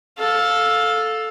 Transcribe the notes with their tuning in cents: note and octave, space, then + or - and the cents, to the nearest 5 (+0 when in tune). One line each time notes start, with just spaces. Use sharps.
A4 +0 F5 +20